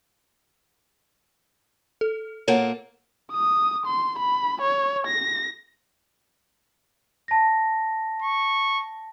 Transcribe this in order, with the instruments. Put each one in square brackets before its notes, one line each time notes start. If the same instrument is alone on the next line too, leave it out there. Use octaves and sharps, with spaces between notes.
[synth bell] A4
[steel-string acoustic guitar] A#2 A#3 A4 [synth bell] C#5 F#5
[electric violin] D#6
C6
B5
C#5
A#6
[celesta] A5 A#6
[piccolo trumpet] C#6